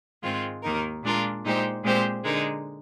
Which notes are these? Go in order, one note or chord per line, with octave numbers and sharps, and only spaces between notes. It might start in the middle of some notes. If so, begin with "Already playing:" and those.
G#2 D#3 G#3 C4 F4
D#2 D#3 A#3 D#4 A#4
A#2 G#3 D4 F4 A#4
A#2 G#3 D#4 G4 C5
A#2 G#3 C4 G4 C5
D3 G#3 D#4 A#4